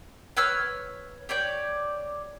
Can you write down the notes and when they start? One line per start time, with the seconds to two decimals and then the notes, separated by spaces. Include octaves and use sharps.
0.37 B4 C#5 E6 F6
1.29 G4 C#5 D5 G6